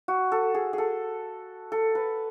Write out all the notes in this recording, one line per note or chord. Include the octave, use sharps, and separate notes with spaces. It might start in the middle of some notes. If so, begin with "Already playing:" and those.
F#4
A4
G#4
G#4
A4
A4
B4